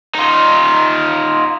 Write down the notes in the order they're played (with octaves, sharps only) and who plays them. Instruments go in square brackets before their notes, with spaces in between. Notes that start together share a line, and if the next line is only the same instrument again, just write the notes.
[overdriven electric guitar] D#4 F4